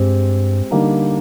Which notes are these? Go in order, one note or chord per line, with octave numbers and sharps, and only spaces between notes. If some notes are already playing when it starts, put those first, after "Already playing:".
Already playing: G2 G#3 C4 G4
D3 G3 A#3 D#4